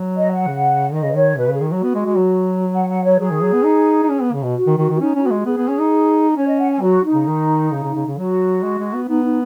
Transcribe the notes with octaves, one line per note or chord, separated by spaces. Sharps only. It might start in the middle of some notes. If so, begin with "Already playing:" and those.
Already playing: F#3
D#5
F#5
C#3
D#3 D#5
C#3 B4
D#3 C#5
B2 B4
C#3 G#4
D#3
F#3 F#4
B3
G#3
G#3
F#3
F#5
F#5
C#5
F#3 G#4
D#3
F#3
B3
D#4
D#4
C#4
B3
C#3
B2
F#4
D#3
D#3 F#4
D#3 F#4
C#4 D#4
C#4 D#4
B3 F#4
G#3
F#4
B3 G#4
B3
C#4
D#4
C#4 C#5
D#5
F#5
G#5
F#3 F#4
D#4
C#3
D#3
C#3
C#3
C#3
C#3
F#3 F#4
G#3
G#3
B3
B3 D#4
D#4